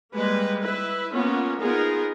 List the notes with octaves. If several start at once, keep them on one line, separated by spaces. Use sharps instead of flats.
G3 G#3 A#3 B4
E4 B4
A#3 B3 C#4 F4
B3 D#4 F4 G#4 A#4